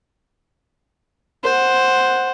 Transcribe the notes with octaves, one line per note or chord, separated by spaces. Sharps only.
C5 F#5